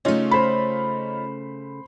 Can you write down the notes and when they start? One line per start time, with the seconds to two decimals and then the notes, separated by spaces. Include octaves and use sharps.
0.05 C#3 A3 C#4 D#4 F4
0.31 C5 B5